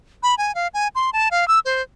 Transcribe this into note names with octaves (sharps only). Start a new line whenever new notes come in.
B5
G#5
F5
G#5
C6
A5
F5
E6
C5